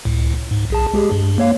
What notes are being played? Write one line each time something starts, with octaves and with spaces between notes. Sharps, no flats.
C#2 A2
G#2
B1 G#4 A5
G#3 G4 G#4
G2
A#3 C#5 F5